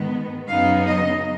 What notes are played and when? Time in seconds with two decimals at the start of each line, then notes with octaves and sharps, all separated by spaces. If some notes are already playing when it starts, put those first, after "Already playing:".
Already playing: G#2 D#3 G#3 B3
0.47 F#2 C#3 F#3 B3 D#4 F5
0.87 D#5